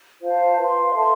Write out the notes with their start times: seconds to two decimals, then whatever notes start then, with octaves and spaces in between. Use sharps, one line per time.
0.22 F4 C5 F5 A5
0.57 B4 F5 C6
0.93 A4 E5 A5 C6